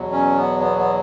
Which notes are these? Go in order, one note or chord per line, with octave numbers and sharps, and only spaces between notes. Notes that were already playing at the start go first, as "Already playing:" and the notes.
Already playing: E2 B2 F#3
C#4
B3
B3
B3